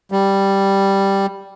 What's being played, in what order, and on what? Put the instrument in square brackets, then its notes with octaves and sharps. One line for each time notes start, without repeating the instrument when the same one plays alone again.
[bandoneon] G3